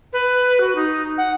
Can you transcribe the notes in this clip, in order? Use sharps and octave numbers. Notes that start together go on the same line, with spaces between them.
B4
F#4
D#4
F#5